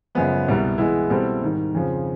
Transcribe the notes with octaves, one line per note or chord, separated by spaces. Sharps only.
F#2 C#3 F3 G#3 B3
C2 B2 G3 B3
E3 G#3 B3 E4
B2 G3 C4 E4 A4
G#2 D#3 G3
F2 C#3 F3